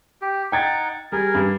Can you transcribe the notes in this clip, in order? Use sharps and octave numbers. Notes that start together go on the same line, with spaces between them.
G4
D#4 F#5 G5 G#6 A6
G3 G#4 A#4
G2